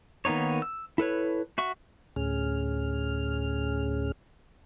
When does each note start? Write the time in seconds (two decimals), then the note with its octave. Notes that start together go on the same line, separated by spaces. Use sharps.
0.25 D#3 A#3 B3 D#4 C#5
0.62 E6
0.98 E4 A4 B4 C#5
1.58 F#4 E5 C#6
2.16 D2 A2 C#4 G#4 F6